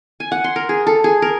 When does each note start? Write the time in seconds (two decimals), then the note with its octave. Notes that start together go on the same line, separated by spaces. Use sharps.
0.20 G#5
0.32 F#5
0.44 C6
0.56 A#4
0.69 G#4
0.87 A4
1.04 G#4
1.22 A#4